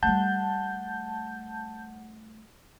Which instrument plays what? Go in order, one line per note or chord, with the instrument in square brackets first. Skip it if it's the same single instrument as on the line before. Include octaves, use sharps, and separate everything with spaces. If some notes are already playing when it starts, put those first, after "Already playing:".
[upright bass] G3 A3 [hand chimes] F#5 [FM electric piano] A5 G6